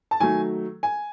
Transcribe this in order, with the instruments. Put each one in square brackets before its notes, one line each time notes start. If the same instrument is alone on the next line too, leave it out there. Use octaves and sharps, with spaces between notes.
[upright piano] A5
D#3 F#3 A3 G#5
G#5